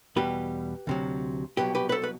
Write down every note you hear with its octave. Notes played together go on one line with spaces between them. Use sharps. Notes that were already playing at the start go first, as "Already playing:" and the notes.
E2 B2 G3 G4 B4
D2 C3 F#3
C2 B2 F#3 G4 B4
G4 B4
B4
A4 C5
B4